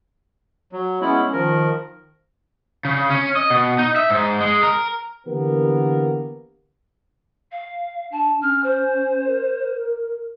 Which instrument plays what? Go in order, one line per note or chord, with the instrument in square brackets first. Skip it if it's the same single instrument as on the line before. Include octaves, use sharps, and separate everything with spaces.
[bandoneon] F#3
[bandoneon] G#3 B3 E4 [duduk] C#4
[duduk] D#3 [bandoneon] F3 A#4
[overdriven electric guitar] C#3
C#4
D#5
B2
D#4
E5
G#2
G#3
A#4
[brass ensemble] D3 E3 A#3 B3 G4 A#4
[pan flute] F5
[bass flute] D4 [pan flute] A5
[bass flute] C#4 [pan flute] F6
[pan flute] C5
[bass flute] A#4